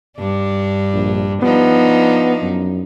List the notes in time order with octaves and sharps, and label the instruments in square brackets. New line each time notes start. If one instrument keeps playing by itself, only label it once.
[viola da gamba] G2 D4
[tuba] A#1
[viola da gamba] F3 D4 D#4 [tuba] B3
[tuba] F#2